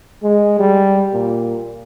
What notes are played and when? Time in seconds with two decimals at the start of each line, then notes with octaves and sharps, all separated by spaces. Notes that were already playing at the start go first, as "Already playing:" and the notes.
0.23 G#3
0.59 G3
1.13 A#2